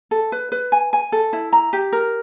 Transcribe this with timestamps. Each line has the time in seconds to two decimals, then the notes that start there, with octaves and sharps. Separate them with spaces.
0.11 A4
0.32 B4
0.52 B4
0.72 G#5
0.93 G#5
1.12 A4
1.33 E4
1.53 A#5
1.73 G4
1.93 A#4